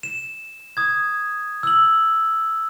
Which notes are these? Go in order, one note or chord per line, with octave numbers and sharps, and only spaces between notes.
E7
D#6 G#6
E6 F#7